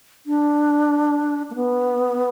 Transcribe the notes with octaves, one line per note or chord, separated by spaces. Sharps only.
D4
A#3
B3